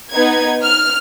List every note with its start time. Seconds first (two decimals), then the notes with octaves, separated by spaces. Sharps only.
0.12 B3 D#4 G#6
0.63 F6